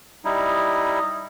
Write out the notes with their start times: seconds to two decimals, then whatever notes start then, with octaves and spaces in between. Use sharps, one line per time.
0.25 G3 D#4 E4